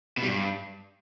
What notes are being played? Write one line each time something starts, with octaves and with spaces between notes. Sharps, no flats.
B2
G3
G2